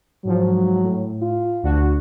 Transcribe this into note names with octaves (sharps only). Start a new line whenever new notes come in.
G#2 F3 F#3
A2
F4
D2 D4 F#4